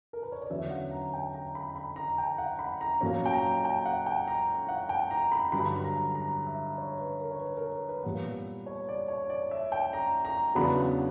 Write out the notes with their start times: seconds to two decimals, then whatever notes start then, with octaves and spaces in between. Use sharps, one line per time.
0.13 A#4
0.23 B4
0.32 C#5
0.41 D5
0.50 E2 D3 F#3 C#4 E5
0.70 F#5
0.91 A#5
1.13 G5
1.34 A#5
1.55 B5
1.76 B5
1.96 A#5
2.18 G5
2.38 F#5
2.59 B5
2.81 A#5
3.01 A#2 F#3 A#3 C#4 A#5
3.26 G5
3.33 A#5
3.65 G5
3.86 F#5
4.06 G5
4.28 A#5
4.69 F#5
4.89 G5
5.11 A#5
5.32 B5
5.52 G2 D3 F#3 B5
5.84 A#5
6.15 A#5
6.47 E5
6.78 C#5
7.00 B4
7.21 A#4
7.32 C#5
7.41 B4
7.57 A#4
7.72 A#4
7.89 B4
8.04 A#2 G3 B3
8.66 C#5
8.89 D5
9.08 C#5
9.30 D5
9.51 E5
9.72 G5
9.93 A#5
10.25 A#5
10.55 E2 C#3 F#3 B3 D4 B5